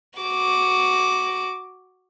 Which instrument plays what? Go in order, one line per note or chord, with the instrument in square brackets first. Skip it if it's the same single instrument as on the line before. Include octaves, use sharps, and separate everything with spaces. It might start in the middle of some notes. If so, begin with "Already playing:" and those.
[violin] F#4 D6